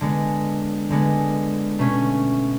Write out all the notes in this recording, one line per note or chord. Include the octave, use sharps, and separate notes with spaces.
D3 G#3 B3
D3 G#3 B3
B2 A3 C#4